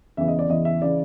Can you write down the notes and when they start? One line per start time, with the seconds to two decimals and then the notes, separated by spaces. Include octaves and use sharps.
0.17 E2 C#3 E3 E5
0.28 D#5
0.39 D5
0.49 E2 C#3 E3 D#5
0.65 E5
0.82 C#3 E3 D5